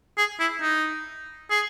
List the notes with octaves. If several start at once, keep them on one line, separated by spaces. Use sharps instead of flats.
G#4
E4
D#4
G#4